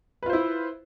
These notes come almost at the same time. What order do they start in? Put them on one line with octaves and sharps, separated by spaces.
B4 F4 C5 E4